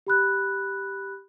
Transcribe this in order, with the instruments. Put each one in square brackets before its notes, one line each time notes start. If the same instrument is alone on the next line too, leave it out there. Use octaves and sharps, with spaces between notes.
[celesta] G4 B5 F#6